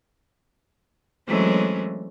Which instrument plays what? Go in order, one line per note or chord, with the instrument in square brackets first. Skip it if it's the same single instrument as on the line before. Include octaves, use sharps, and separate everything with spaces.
[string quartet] E3 F#3 G#3 A3 C4 C#4